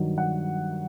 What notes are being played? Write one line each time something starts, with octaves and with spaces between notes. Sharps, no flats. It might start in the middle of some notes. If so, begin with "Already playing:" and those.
Already playing: G2 D#3 F#3
F#5